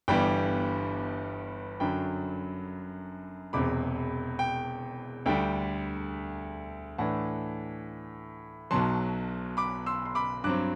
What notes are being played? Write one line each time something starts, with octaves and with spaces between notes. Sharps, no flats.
G1 G2 E3 G3 B3 G5 B5
F#2 D3 F#3 G5 B5
E1 E2 C3 B5 D6
G5
D2 D3 G3 G5
A2 E3 A3 D4 F#5 A5
B1 B2 F#3 A5 C6
B5 D6
C6 E6
C6
B5 D6
G2 F#3 C4 D6 F#6